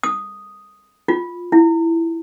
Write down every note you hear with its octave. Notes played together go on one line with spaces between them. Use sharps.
D#6
F4
E4